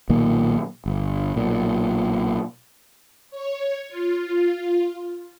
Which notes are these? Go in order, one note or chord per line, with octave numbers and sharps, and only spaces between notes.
B1 A#2 D#3 A#3
G1
B1 A#2
C#5
F4